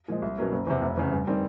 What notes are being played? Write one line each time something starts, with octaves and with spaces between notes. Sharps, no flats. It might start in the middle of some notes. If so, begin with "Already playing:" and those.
A#2 F3 G#3
C2
B2 F#3 A#3 C#4
F#1
E2 C3
F1
E2 C#3
G2
D#3 G3 C4